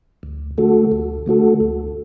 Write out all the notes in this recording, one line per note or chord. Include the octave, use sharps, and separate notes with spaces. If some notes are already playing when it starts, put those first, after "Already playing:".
D2
D3 A3 F#4 A4
D2
D3 A3 F#4 A4
D2